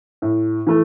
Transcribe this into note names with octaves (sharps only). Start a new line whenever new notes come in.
A2
E3 A3